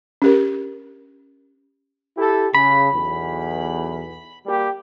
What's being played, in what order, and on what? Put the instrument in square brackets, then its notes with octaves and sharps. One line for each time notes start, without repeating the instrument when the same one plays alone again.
[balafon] C#4 G4 A#4
[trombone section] E4 G4 A4
[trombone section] C#3 [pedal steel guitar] B5
[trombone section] B1 E2
G3 A#3 G4